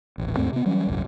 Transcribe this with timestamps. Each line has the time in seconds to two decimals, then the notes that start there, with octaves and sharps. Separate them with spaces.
0.18 D#1 A1
0.37 D#2 G#2 A3 C4
0.53 C3 B3
0.66 E3 F#3 G3 C#4
0.87 D#1 C2 F#2